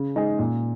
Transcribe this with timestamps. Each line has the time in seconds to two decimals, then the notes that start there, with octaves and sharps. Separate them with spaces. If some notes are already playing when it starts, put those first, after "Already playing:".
Already playing: C#3
0.16 G#3 D#4 G#4
0.39 A#2